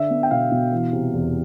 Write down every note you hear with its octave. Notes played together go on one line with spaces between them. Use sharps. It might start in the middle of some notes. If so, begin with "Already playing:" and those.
Already playing: D3 D4 E5
B3
G5
B2 F5
B2
E3
C3
E2